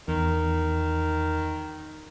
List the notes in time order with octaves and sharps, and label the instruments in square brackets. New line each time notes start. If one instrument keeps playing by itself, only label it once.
[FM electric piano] E2 [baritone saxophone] D#3